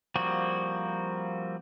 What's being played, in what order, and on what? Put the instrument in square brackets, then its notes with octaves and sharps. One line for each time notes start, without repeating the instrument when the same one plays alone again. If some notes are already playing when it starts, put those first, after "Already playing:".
[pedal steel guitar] F3 G3 A#3 C4 F#4